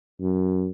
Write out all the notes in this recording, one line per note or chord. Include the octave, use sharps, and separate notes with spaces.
F#2